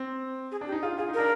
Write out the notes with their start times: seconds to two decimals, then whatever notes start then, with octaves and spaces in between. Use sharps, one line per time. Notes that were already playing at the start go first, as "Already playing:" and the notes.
Already playing: C4
0.52 G#4
0.61 D4
0.67 G4
0.72 D#4
0.82 F4 G#4
0.98 F4 G#4
1.09 D#4
1.14 D4 A#4